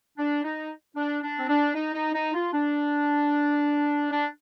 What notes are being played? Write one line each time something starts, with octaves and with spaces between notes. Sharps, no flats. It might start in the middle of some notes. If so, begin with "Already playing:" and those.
D4
D#4
D4
D4
C4
D4
D#4
D#4
D#4
F4
D4
D4